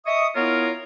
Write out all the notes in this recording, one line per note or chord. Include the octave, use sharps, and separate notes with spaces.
D#5 E5 C#6 D#6
B3 E4 F4 A#4 C#5